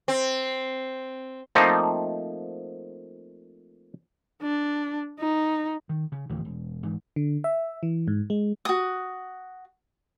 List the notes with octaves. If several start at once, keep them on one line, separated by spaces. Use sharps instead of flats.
C4
F3 A3 A#3 C4 D#4
D4
D#4
D#3
C#3
D2 A2 E3 F3
E1
G#2 E3
D3
E5
E3
G#2
G#3
F#4 D#6